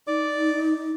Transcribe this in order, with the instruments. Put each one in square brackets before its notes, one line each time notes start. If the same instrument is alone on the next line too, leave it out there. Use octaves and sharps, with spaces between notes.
[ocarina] D#4 [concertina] D5 D6